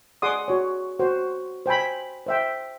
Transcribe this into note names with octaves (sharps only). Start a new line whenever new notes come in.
G#4 D5 F#5 C6 D6 D#6
F#4 C#5
F#4 C5
C5 G5 G#5 B5
C5 E5 G5